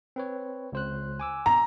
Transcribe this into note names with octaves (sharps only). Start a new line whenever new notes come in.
C4 B4 C#5
C#2 C5 F#6
G#5 D6 E6
A#5